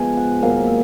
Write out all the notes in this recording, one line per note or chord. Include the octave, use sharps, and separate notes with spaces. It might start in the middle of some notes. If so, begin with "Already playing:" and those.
Already playing: F3 G#3 B3 G#5
F#5
G#2 D#3 F#3 A#3 F5
E5